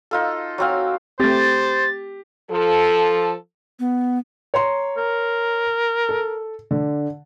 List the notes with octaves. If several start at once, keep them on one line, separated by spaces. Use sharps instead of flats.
D#4 F4 A4
F#3 C4 F5
A3 C4 G4 C5 A6
F3 A4
B3
C#5 A#5 C6
A#4
A4
D3